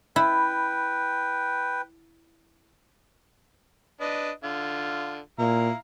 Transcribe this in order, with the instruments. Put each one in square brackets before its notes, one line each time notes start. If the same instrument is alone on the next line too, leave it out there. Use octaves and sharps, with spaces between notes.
[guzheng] E4 [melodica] B4 G5
[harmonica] D4 B4 D#5
D3 F4
[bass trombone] A#2 [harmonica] E4 F5 A#5